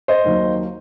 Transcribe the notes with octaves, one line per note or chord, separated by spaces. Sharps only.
C5 D#5
D#2 D#3 F#3 A#3